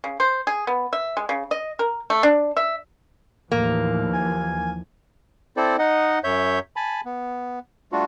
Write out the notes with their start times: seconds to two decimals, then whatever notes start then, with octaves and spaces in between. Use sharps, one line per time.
0.04 C#3
0.20 C5
0.47 G#4
0.67 B3
0.93 E5
1.17 G#3
1.29 C#3
1.51 D#5
1.79 A#4
2.10 A3
2.23 D4
2.57 E5
3.52 D#2 A2 E3 F3 A#3
4.13 G#5
5.57 C4 E4 A4 C5 D5
5.79 D#4 D#5 F#5
6.24 F#2 C#5 E5 G6
6.76 G#5 A5 B5
7.05 B3
7.92 G3 A3 D4 F4 F#4